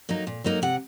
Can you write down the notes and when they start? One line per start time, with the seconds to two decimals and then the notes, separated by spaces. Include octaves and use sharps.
0.09 F#3 A#3 D#4
0.27 A#2
0.44 F#3 A#3 D#4
0.62 C3 F#5